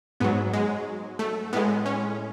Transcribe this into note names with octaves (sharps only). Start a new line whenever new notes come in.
G#2 F#3 B3
G#3
A3
A2 G#3 B3
C#4